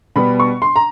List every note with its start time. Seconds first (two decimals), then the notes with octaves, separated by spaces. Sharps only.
0.16 B2 G3 B3 B5
0.39 C#6
0.62 C6
0.76 A#5